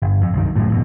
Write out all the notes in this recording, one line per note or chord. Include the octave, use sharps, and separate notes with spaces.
G1
F2
C2 F#2 D#3
G1 F#2 A2
G#1 F2 B2